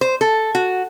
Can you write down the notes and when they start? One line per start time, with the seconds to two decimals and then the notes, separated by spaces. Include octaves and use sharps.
0.01 C5
0.21 A4
0.55 F#4